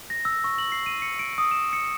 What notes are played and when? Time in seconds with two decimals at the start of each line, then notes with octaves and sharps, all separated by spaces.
0.10 A#6
0.25 E6
0.44 C#6
0.58 F#7
0.72 C7
0.86 D#7
1.02 C#7
1.19 D7
1.38 D#6
1.51 E7
1.73 C#7